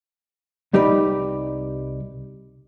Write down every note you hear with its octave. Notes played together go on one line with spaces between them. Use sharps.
C2 G3 D#4 G4 B4 D5